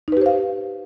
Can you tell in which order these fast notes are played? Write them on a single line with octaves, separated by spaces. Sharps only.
D#4 B4 G4 C5 F5